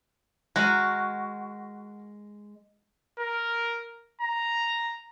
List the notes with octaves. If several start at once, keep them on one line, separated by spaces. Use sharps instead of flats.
G#3 F#4 A#4 G#5
A#4
A#5